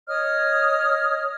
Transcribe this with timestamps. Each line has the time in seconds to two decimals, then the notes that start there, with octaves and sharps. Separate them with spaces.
0.07 C#5 D#5 D#6 F6